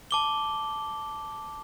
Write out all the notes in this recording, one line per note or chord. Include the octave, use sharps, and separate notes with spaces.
A5 D6 G7